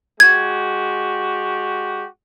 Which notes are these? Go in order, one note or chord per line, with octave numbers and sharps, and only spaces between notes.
G#3 F#4 G4 G#6